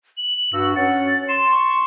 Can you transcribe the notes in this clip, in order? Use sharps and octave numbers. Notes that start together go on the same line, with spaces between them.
F#7
G2 F#4 E6
C#4 C#5 F#5 A6
C6 E7
C#6